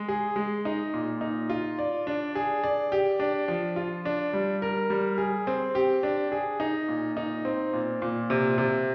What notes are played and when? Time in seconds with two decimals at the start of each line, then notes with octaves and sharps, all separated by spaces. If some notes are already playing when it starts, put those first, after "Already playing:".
Already playing: G#3
0.08 G#4
0.36 G#3
0.65 D#4
0.94 A#2
1.21 D#4
1.50 F4
1.79 D5
2.07 D4
2.35 G#4
2.64 D5
2.92 G4
3.20 D4
3.48 F3
3.76 F4
4.05 D4
4.33 G3
4.62 A#4
4.90 G3
5.18 G#4
5.47 C4
5.75 G4
6.03 D4
6.32 G#4
6.60 D#4
6.88 A#2
7.17 D#4
7.45 C4
7.73 A#2
8.02 A#2
8.30 C3
8.58 C3